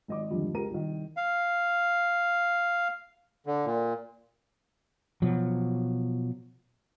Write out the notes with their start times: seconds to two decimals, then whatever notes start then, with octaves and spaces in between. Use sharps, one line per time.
0.08 G#1 D#5 D6
0.30 F2 G#2 D3 D#3 F3 G3
0.54 C#2 G4 A#4 A#5 D#7
0.71 C2 D#3
1.17 F5
3.46 D3
3.66 A#2
5.22 B2 F3 F#3